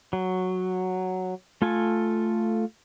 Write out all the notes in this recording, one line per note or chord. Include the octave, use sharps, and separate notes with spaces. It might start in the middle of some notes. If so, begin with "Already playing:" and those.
F#3
A3 F4 A4 G#5